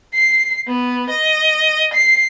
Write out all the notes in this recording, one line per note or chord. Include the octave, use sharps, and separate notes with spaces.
C7
B3
D#5
C7